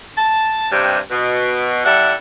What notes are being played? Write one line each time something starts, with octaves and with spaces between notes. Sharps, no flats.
A5
G2 C3
B2
G3 E4 A4 F#5